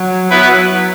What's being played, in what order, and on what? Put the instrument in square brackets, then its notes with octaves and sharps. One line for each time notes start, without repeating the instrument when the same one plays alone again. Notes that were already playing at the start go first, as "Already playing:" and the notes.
Already playing: [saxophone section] F#3
[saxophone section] F#3 [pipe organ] B3 E4 B4 E5